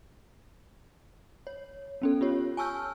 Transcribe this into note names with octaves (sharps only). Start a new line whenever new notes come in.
C#5
B3 C#4 A4
F4 G4 C#5
G#5 A5 C#6 E6 F6 G6